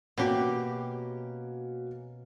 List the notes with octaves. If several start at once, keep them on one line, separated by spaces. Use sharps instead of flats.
B2 A#3 C#4 F#4 G4